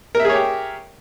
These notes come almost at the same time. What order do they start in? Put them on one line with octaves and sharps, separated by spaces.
A#4 E5 G#4 C#5 G4